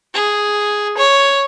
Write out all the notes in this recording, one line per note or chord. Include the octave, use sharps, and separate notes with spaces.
G#4
C#5